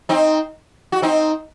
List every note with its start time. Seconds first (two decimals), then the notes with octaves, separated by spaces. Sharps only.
0.09 C4 D#4
0.92 F#4
1.02 C4 D#4